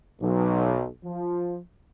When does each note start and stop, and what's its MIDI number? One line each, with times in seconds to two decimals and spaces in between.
0.21 0.86 35
1.04 1.58 53